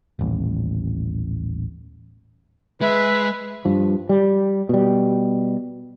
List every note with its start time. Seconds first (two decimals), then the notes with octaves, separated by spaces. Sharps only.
0.19 D#1 A1
2.81 G#3 B4 E5
3.65 G2 F3
4.09 G3
4.69 B2 G3